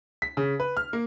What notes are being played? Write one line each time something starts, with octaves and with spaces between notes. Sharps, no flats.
B6
C#3
B4
F6
A#3